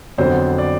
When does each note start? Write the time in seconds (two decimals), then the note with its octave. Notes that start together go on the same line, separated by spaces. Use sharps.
0.18 F2 D3 F#3 B3 C5
0.58 D5